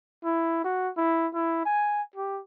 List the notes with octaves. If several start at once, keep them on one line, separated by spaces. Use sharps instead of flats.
E4
F#4
E4
E4
G#5
G4